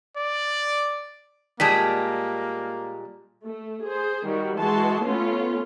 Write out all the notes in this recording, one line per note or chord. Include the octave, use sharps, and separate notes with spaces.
D5
A#2 G3 G#3 A#3 A5 B6
A3
G#4 C5
D#3 G3 F#4
E3 G#3 F#4 A5 C6
A3 B3 C#4 F4